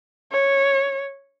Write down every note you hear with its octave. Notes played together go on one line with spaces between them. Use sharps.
C#5